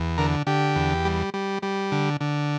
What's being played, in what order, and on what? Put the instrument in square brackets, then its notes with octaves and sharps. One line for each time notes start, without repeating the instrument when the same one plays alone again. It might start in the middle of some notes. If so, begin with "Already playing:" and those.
Already playing: [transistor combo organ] E2
D3 A#4
D3 G4
E2
G3
G3
G3
D3
D3